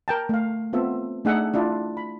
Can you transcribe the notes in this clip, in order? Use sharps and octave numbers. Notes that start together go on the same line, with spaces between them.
A#4 G5 A5
A3 F5
B3 C4 F4 A4 E5
A3 D4 D#4 G#4 E5 F#5
D4 E4 F4
B5